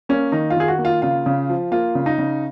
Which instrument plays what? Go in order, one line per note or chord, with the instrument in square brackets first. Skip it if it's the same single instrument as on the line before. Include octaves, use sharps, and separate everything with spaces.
[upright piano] A#3 C#4
D#3 D#4
F4
D#3 G#4
F#4
A#3
F4
C#3 F4
C#3
F3
A#3 F4
C#3
D#4
C#3